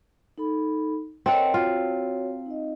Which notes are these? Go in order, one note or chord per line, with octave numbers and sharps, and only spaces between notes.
D#4 A4 B5
C4 A4 A#4 C#5 D#5 F#5
F4 F#4 C#5
D#4 D#5